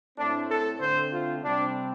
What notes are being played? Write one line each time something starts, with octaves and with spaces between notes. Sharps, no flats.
A2 A3 C4 D4
A4
D3 A3 C4 C5
F4
C3 G3 C4 D4